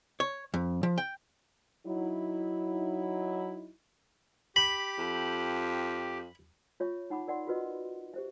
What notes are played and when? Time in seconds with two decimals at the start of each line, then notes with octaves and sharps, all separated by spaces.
0.20 C#5
0.54 F2
0.83 F3
0.98 G5
1.86 F#3 D#4 E4
4.56 G4 B5
4.99 F2
6.80 F4 C#5 E5 C#6
7.10 D#4 F#5 B5 D6
7.28 A#4 D5 F#5 C6
7.47 F4 F#4 A#4 B4 D#5
8.14 G4 C5 E5